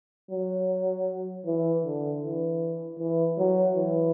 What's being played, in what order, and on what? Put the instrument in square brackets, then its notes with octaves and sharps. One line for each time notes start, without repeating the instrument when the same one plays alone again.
[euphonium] F#3
E3
D3
E3
E3
F#3
E3